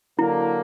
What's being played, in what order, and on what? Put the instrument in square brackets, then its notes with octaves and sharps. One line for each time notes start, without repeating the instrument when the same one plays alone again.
[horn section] D3 F#3 A#3 [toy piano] E4